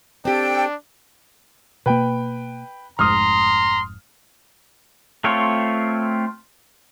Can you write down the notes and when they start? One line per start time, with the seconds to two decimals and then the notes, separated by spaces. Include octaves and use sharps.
0.25 C4 D4 G4 A4 G5
1.86 B2 A#3 B4 G5
2.99 F1 G#2 A#5 C6 D#6 F6
5.24 A3 C4 F4 C#5